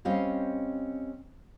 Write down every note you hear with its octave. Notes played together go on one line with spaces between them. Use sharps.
G3 C4 C#4 D#5 F5